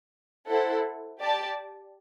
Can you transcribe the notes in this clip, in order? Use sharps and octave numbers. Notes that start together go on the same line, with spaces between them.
E4 A4 C5 F#5
G4 D5 A5